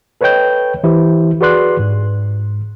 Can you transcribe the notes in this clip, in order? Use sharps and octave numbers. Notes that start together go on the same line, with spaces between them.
A4 B4 C#5 D#5 G5 G6
E3 E4 G4 C5
F#4 G#4 B4 D5 C6 F#6
G#2